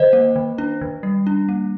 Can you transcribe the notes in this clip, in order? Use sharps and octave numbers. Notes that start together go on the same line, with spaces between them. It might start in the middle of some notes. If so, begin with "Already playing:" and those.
Already playing: D#3 C5 D#5
A#3
D#3
D4
D#3
G3
D4
A#3